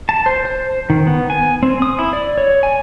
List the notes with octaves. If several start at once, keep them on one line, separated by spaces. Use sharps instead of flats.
A5
C5
C5
D#3
B3
G#5
C4
D#6
E4
D5
C#5
G#5